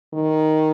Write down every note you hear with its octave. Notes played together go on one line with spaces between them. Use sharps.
D#3